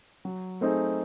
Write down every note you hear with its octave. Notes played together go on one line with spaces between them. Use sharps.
F#3
A3 C4 D#4 G#4